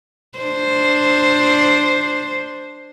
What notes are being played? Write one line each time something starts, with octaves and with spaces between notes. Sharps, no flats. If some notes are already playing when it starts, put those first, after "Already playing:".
D4 C5